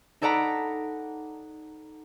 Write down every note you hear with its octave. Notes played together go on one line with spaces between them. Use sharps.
D#4 A4 D5 F#5 A#5 B5